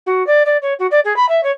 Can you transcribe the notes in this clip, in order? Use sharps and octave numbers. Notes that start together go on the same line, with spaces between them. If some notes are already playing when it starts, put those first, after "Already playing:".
F#4
D5
D5
C#5
F#4
D5
G#4
B5
E5
C#5